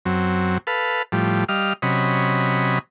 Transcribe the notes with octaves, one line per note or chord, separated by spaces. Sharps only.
F#2 F#3 C4
A4 B4 F5
A2 F3 G3
G3 D#5 F5 F6
C3 F#3 C#4 D#5 B5